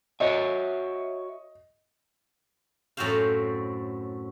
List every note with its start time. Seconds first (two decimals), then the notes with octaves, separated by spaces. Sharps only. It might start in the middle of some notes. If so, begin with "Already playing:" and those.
0.20 F#4 C#5 D#5 E5
2.97 F#2 A2 C4 F#4 C5 F5